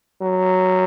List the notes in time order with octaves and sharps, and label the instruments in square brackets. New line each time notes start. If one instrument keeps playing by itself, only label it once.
[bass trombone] F#3